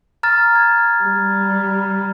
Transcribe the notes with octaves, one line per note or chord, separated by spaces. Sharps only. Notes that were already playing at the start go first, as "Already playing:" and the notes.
A#5 F6 A6
G#6
G3